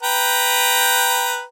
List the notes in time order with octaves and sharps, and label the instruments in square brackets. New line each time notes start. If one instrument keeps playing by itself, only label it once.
[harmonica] B4 G5 A#5